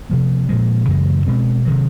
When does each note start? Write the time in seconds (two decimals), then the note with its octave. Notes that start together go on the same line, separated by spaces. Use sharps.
0.10 C3 F3 A#3
0.49 A#2 F3 G#3
0.88 F#2 C#3 E3 G#3
1.27 B2 G#3 C4
1.65 C3 D#3 F#3